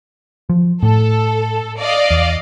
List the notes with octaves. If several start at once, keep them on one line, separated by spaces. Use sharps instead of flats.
F3
A2 A4
D5 D#5 F5
E2